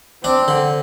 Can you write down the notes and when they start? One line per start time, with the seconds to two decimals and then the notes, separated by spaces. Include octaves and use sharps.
0.24 C4 D4
0.48 D3